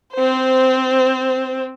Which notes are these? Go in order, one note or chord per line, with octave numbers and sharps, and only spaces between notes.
C4 C5